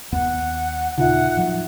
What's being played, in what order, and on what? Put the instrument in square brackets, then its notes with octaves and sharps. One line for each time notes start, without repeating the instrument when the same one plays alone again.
[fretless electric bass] D#2 B3 [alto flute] F#5
[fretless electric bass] D#2 A#2 C#3 [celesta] D#4 F4 E5 [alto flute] F#5
[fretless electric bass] A2 F3 F#3